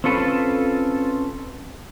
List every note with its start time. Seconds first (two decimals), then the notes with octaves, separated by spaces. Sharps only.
0.04 C4 C#4 F4 A4 B4